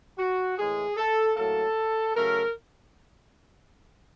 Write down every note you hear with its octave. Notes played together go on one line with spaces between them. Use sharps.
F#4
A2 E3 G#3 G#4
A4
A2 F#3 A#3 A4
C#3 F#3 A3 A#4